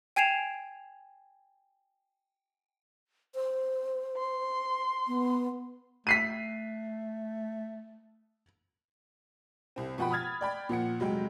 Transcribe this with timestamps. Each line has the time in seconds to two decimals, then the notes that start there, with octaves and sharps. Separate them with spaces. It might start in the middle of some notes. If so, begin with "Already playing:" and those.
0.16 G5 G#5 G#6 C7 E7 F7
3.35 C5
4.17 C6
5.08 B3
6.07 A3 B6 C7 D#7
9.76 C2 C4
9.98 B2 F3 F#5 G5 B5
10.11 B5 D#6 F6 G#6 A6
10.41 D5 G5 B5
10.69 A#2 F3 F#5 C#7
11.00 F1 F#3 G#3 G5